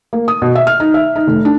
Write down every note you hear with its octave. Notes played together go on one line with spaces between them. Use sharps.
A#3
D#6
B2
E5
F6
D#4
E5
D#4
F1
D4